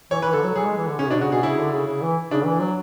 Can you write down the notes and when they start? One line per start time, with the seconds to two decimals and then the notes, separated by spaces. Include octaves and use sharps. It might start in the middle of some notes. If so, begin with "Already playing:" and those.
0.11 E3 C#5
0.22 E3 B4
0.33 D3 A4
0.44 F#3
0.55 F#3 G#4
0.65 G#3
0.77 E3
0.88 D3
0.99 C#3 C#4
1.10 B2 D4
1.21 C#3 F#4
1.32 B2 G#4
1.43 C#3 E4
1.57 D3
1.72 C#3
1.87 C#3
2.02 E3
2.31 C#3 D4
2.45 E3
2.60 F#3